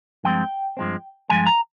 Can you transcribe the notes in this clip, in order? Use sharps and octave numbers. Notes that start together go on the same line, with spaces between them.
G2 F3 G#3 C4 G5
G2 F3 G#3 C4
G2 F3 G#3 G#5
A#5